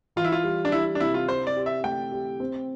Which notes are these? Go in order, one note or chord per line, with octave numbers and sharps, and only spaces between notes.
E3 F4
E4
F4
G3
D4
G3 E4
D4
C3 E4
F4
E4 C5
D5
G4
E5
A3 G5
G4
C4